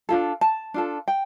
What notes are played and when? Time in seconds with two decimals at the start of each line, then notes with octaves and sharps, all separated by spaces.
0.09 D4 F4 A4
0.41 A5
0.74 D4 F4 A4
1.08 G5